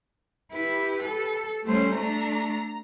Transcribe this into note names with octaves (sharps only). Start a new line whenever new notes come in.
E4 G4 B4
A4
G3 A3 C#4 C5
A3 D4 A#5